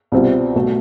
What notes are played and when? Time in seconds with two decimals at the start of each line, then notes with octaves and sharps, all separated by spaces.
0.12 C2 B2 G3 C4 F4
0.55 B1 B2 A3